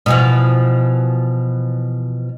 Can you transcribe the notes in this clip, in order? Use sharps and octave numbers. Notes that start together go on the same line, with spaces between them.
B2 E3 F3